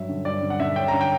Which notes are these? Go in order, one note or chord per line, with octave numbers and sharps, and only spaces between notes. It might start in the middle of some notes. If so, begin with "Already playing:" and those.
Already playing: G2 F#3 E5
D3
G2 D5
D3
F#5
D3 E5
C#4 G5
A#5
D3
G5